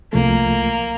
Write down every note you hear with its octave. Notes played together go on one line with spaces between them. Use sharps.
C2 F3 A3 A#3